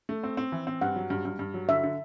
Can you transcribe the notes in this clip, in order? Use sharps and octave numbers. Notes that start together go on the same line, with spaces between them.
A3
C4
C4
E3
C4
G2 F#5
F#3
G2
G2
G2
F#3
D3 E5
D3